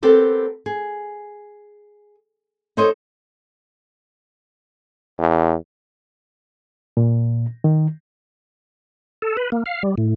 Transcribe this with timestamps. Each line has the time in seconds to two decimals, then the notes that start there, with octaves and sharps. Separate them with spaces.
0.03 B3 C4 G4 A4 A#4
0.66 G#4
2.77 D#4 A4 C5 C#5 D#5
5.19 E2
6.97 A#2
7.64 D#3
9.22 A4
9.37 B4
9.52 A#3
9.66 F5
9.83 G3
9.98 A2